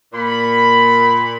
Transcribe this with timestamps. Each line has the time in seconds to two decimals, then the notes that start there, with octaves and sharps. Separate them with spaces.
0.13 A#2 B5